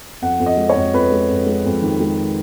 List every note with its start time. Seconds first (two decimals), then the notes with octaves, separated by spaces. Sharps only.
0.22 F2 F#5
0.40 F2
0.46 D#5
0.57 G#3
0.69 C#5
0.76 F2
0.94 F2 B4
1.12 G#3
1.29 F2
1.46 G#3
1.65 F2
1.82 D#3
2.00 G#3